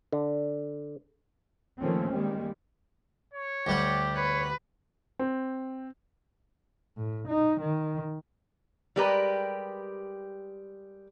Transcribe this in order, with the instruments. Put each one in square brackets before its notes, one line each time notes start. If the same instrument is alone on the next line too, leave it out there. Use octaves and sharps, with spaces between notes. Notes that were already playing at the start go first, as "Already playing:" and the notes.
[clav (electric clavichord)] D3
[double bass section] D#3 F3 A3 A#3 C4 C#4
D#3 G3 G#3 A#3
[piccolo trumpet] C#5
[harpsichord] D2 G3 F#5 [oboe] G4
[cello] B4 [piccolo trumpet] C#5
[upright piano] C4
[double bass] A2
D#4
D#3
[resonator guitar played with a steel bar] G3 G#3 G4 A#4 B4